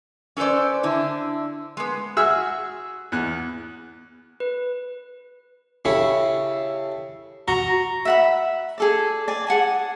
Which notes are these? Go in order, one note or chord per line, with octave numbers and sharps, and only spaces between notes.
C#4 A4 B4 C5 D5
D3 D4 E4
G#3 B3
F#4 G#4 E5 E6 F6
E2 F#6
B4
C#3 E4 G4 A4
F#4 A#5 G7
E5 F#5 B5
G#4 A4 D5
D5 G#5
G#4 F#5 G#5 A5